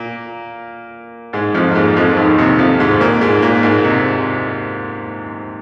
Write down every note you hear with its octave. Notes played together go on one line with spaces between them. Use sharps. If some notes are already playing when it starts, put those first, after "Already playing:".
Already playing: A#2 A#3
G#2 G#3
F2 F3
A#3
G#2 G#3
F2 F3
F3
D#2 D#3
C3
F2 F3
G#2 G#3
A#2 A#3
G#2 G#3
A#2 A#3
G#2 G#3
C3